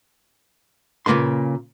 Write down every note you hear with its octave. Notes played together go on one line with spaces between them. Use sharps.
A#2 C#3 A#3 B4 C6